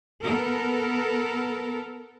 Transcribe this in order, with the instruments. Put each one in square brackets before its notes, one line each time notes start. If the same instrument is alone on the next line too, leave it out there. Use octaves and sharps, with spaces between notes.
[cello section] B3 A4 A#4